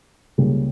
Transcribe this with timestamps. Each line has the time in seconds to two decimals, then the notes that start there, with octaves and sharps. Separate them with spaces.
0.38 C#2 C#3 G3 A#3 C#4